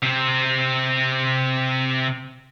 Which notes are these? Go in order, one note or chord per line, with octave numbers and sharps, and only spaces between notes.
C3 C4